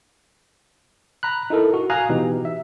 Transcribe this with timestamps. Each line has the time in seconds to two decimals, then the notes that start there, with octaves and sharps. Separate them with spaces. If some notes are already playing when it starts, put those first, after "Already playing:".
1.23 A#5 B5 F#6
1.50 D#4 E4 A4 A#4
1.74 F#4
1.90 F5 G#5 A#5 D#6 F#6
2.09 B2 E3 D#4 G4
2.45 E5